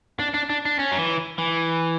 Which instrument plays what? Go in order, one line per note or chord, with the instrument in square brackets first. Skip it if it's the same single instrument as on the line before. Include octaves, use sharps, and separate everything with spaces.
[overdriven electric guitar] D4
D4
D4
D4
C#4
F#3
E3
E3